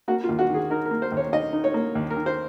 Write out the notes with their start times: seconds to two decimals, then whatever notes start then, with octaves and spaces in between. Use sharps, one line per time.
0.08 A#3 F#4
0.24 F4
0.29 D#2
0.39 F#4
0.50 D#3 G#4
0.70 D#4 A#4
0.86 A#4
0.91 A#3
1.02 C5
1.12 D#2
1.17 C#5
1.32 D#3 D#5
1.53 D#4
1.64 C#5
1.74 A#3
1.95 D#2
2.10 A#4
2.16 D#3
2.26 C5